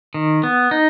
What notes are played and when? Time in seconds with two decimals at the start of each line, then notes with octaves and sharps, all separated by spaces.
0.14 D#3
0.43 B3
0.71 D#4